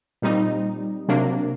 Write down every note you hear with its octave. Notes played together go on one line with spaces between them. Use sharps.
A#2 G3 C4 D#4
C3 F#3 A#3 D4